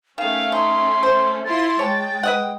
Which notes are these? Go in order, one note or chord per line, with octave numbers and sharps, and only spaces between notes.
D#3 A3 C#4 F5
D#4 C6
C5
E4 F4 C6 A6
G#3 C#5 G5 A5
B4 D#5 F#5